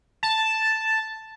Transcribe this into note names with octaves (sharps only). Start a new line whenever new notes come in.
A5